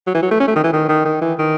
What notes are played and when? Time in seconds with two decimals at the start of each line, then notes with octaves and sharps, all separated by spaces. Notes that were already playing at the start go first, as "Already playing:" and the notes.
0.07 F#3
0.15 E3
0.23 F#3
0.31 A3
0.40 C#4
0.47 A3
0.56 D#3
0.64 E3
0.73 D#3
0.89 D#3
1.05 D#3
1.22 E3
1.39 D#3